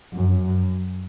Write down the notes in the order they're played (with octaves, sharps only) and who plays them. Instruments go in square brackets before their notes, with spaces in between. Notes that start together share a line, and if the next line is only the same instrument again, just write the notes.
[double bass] F#2